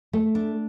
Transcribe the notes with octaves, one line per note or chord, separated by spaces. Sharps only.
A3
D4